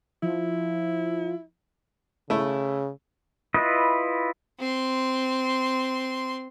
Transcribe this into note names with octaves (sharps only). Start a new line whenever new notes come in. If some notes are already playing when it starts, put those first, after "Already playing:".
F3 E4
C#3 A3 E4
E4 F4 B4 D#5
C4 C6